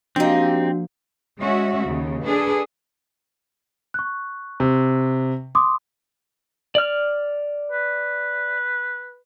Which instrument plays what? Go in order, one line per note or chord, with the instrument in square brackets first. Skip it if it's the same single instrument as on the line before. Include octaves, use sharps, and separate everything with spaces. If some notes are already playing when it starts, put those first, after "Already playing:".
[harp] F3 A#3 [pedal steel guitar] C4 [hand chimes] D4 F#4 [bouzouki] D#4 G4
[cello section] G#3 C#4 F#4 E5
D#2 C#3
D4 G#4 A4 B4
[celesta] C#6 F#6
[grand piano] C3
[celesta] C6 D6 D#6
[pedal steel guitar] D5 F6
[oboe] B4